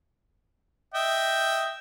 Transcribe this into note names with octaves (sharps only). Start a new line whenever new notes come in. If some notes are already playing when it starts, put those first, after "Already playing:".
D#5 E5 G5